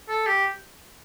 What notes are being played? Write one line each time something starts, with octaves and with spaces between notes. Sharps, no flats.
A4
G4